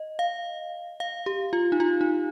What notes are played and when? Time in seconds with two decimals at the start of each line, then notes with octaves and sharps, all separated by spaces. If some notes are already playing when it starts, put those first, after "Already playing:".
Already playing: D#5
0.19 F5
1.00 F5
1.26 G4
1.53 F4
1.72 D#4
1.80 F4
2.01 D#4